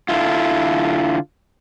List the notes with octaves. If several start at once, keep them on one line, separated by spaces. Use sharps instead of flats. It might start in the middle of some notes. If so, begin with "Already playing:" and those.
D3 E4 F4